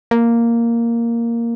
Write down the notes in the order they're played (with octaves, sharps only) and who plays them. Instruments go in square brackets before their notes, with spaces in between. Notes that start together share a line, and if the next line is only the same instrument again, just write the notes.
[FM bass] A#3